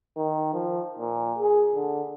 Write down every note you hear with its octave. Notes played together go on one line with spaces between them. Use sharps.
D#3
F3
A#2
G#4
D3